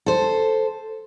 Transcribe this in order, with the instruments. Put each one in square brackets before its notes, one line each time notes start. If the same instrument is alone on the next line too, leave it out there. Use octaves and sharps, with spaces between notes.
[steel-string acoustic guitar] A4 C5